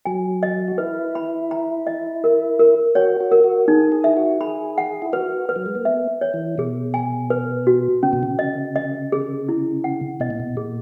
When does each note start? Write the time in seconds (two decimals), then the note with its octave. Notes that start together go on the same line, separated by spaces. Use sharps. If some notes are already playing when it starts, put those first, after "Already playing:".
0.05 F#3 G#5
0.43 D#5
0.68 F#4
0.78 E4 B4
1.15 B5
1.51 A#5
1.87 D#5
2.24 A#4
2.59 A#4
2.95 F#4 C#5
3.21 F#4
3.32 A#4
3.44 F#4
3.68 D#4 G#4
3.92 G#4
4.04 E4 E5
4.17 F#4
4.41 G#4 B5
4.78 F#5
5.02 E4
5.13 F#4 B4
5.49 B4
5.56 F#3
5.66 G#3
5.75 A#3
5.85 B3 E5
6.21 C#5
6.34 E3
6.58 B2 G#4
6.94 G#5
7.30 B4
7.67 F#4
8.03 C#3 C#4
8.13 B2
8.23 C#3
8.39 D#5
8.76 D#5
9.12 G#4
9.49 E4
9.84 F#5
10.20 B2 D#5
10.30 A#2
10.40 B2
10.57 A#2 G#4